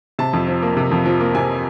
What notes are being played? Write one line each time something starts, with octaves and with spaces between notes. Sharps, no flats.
C3 A5
F2
F3
A#3
C3
F2
F3
A#3
C3 G#5